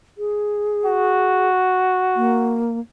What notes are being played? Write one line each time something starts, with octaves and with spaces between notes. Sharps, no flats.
G#4
F#4
A#3